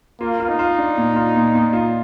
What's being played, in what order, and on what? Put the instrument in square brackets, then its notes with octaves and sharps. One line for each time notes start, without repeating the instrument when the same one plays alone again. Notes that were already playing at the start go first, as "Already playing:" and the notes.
[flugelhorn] A#3 [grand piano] F4
[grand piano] F4
[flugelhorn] D#4
[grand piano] F4
D4
A#2
F4
A#2
A#2
F4